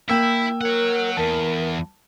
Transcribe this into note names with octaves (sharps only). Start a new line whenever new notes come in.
A#3 E4 G5 E6
A#4 C#5 F#5
E2 A#4 A5